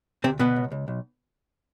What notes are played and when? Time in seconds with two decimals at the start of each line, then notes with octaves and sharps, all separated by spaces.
0.24 D2 C3 C4
0.40 D2 B2 B3
0.56 C#2
0.72 C#2
0.88 B1